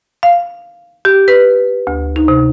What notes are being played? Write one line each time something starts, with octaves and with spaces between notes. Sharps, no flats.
F5
G4
B4
D2
D#4
C3